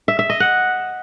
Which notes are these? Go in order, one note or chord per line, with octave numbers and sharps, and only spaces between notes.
E5
E5
D#5
F#5